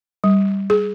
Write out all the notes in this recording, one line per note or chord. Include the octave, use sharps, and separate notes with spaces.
G3
G#4